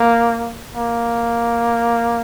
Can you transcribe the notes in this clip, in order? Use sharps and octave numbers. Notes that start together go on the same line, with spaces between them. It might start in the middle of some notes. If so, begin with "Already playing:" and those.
Already playing: A#3
A#3